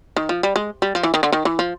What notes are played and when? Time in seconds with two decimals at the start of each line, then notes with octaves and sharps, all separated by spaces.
0.16 D#3
0.29 F3
0.43 G3
0.56 G#3
0.82 G3
0.95 F3
1.03 E3
1.14 D#3
1.23 D3
1.32 D#3
1.45 E3
1.59 F3